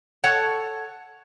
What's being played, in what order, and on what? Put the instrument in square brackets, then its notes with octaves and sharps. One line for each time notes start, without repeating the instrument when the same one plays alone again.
[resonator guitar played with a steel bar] A4 C#5 F#5 A5